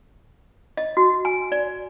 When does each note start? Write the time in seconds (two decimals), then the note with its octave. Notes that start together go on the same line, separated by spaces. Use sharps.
0.77 D#5
0.97 F#4
1.25 G#5
1.52 D5